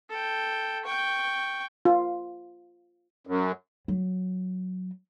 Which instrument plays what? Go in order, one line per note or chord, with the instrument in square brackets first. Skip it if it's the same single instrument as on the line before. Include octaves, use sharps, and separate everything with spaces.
[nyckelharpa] A4 G5
G5 C#6
[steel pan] F4
[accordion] F#2
[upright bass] F#3